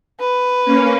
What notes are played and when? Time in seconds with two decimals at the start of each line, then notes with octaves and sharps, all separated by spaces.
0.20 B4
0.65 A#3 C#4